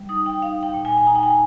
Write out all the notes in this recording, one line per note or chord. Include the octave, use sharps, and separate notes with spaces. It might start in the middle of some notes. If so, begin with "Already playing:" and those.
Already playing: G3
D#4 D#6
G5
D#4 F5
G5
A#2
G#5
G#5
D#4 A#5
G5
G#5